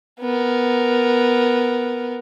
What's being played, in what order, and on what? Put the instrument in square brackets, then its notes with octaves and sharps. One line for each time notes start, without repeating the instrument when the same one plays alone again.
[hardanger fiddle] B3 A#4